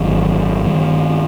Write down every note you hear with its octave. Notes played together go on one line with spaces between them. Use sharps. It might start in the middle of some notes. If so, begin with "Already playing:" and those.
Already playing: G#1 F#2 D#3 F#3
G2 D#3 G3